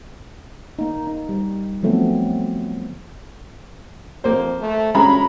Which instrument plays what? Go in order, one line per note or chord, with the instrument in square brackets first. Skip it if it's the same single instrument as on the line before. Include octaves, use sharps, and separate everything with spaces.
[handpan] A#3 D#4
D#4
G3
D3 F3 F#3 A3 B3 C4
[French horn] F2 [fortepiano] A#3 C5
[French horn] A3
[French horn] D2 [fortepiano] G#3 C#4 [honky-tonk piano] A#5 B5